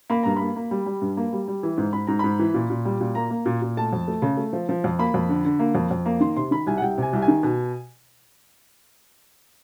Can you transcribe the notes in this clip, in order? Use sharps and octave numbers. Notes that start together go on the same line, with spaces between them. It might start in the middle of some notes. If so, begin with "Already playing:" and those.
A#3 B5
G2 A#5
A#3 B5
A#3
G3
G3
G2
A#3
G3
G3
E3
G#2
G#2 B5
G#2 A#5
G#2 B5
E3
A#2
A#2
G3
A#2
A#3 A#5
A#3
A#2
A#2
A3 A5
F2
A3
C#3
A3
F3
F3
F2
A#3 B5
F2
D3
D3
A#3
F2
F2
A#3
D#3 C6
C3 C6
D#3 B5
C2 G#5
F#5
C2 G5
C3 G#5
C2
G#5
D#3
B2